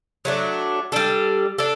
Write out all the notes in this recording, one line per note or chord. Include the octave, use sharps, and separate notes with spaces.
F#3 A3 D4
G3 D4 A4
D4 A4